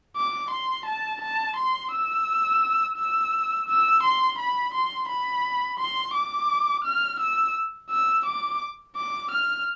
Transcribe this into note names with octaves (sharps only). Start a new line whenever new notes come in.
D6
C6
A5
A5
C6
E6
E6
E6
C6
B5
C6
B5
C6
D6
F6
E6
E6
D6
D6
F6